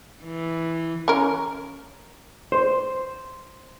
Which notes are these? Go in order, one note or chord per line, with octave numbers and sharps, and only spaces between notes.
E3
C#4 A#4
C5